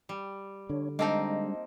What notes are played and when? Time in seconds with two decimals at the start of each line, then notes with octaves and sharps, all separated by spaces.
0.09 G3
0.70 D3 D4 C#5
0.99 G3 G#3 A#3 C4 D4 D#4 D#5 A5